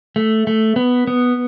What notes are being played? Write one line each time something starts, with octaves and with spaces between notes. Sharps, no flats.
A3
A3
B3
B3